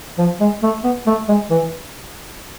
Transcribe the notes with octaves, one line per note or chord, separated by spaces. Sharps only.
F3
G#3
A3
B3
A3
G#3
E3